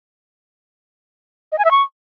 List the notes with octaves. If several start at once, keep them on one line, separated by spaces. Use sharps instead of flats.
D#5
G#5
E5
C#6